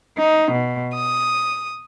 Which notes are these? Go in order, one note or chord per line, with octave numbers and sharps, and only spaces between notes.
D#4
B2
D#6